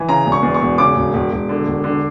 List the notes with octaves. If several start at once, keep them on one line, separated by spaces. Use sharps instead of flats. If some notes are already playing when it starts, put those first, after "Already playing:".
Already playing: E3
C#3 A#5
E1
C#6
E2
C#6
E1
C#3 D6
E1
E1
E1
D3
E1
D3